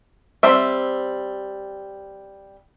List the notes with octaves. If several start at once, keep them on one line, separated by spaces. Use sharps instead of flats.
G3 C4 E5